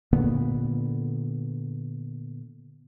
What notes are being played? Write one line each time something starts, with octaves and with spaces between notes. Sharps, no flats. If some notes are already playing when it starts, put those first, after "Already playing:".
A#2 D3 A#3 B3